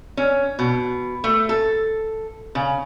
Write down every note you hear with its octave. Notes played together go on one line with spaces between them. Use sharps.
C#4
B2
A3
A4
C#3